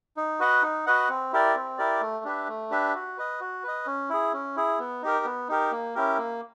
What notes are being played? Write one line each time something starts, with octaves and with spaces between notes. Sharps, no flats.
D#4
F#4 B4 D#5 F#5
D#4
F#4 B4 D#5 F#5
C4
E4 G4 A#4 D5
C4
E4 G4 A#4 D5
A3
D4 G4 B4 E5
A3
D4 G4 B4 E5
F#4
B4 D#5
F#4
B4 D#5
C#4
E4 G#4
C#4
E4 G#4
B3
D#4 G4 A#4
B3
D#4 G4 A#4
A#3
C#4 E4 G4 A#4
A#3